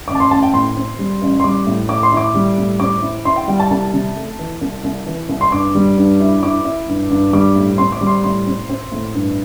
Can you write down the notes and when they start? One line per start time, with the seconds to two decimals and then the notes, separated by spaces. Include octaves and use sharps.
0.08 A1 D6
0.15 A5
0.20 C6
0.31 A1 A5
0.43 G5
0.54 A2 C6
0.77 C4
0.99 G3
1.21 A1
1.40 C6
1.44 G3 D6
1.67 A2
1.89 A2 D6
2.03 C6
2.12 E4 D6
2.35 G3
2.58 A2
2.80 C4 D6
3.02 E4
3.25 E4 C6
3.36 G5
3.48 G3 G5
3.60 A5
3.71 C2 A5
3.93 C3
4.16 A3
4.39 E3
4.61 C2
4.84 C2
5.07 E3
5.29 C2
5.41 C6
5.52 G2 D6
5.75 G3
5.98 G2
6.20 E4
6.42 E4 D6
6.65 E4
6.88 G2
7.10 G2
7.33 G3 D6
7.56 A2
7.78 C4 C6
7.92 D6
8.01 G3
8.07 C6
8.24 A2 C6
8.47 C4
8.69 C4
8.92 A2
9.14 G2